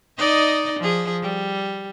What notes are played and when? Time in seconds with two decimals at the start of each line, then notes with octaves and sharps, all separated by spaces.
0.18 D#4 D5 D#5
0.80 F3 G#4
1.22 G3